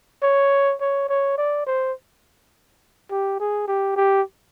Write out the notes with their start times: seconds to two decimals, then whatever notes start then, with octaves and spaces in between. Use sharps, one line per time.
0.23 C#5
0.81 C#5
1.09 C#5
1.38 D5
1.66 C5
3.11 G4
3.40 G#4
3.68 G4
3.96 G4